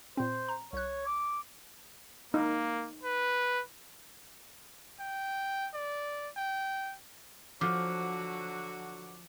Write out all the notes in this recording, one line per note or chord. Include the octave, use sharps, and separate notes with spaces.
A#2 C4 C5
A#5
C2 C#5 F#6
D6
A#3 D#4
B4
G5
D5
G5
D3 F3 F#3 F#4 D6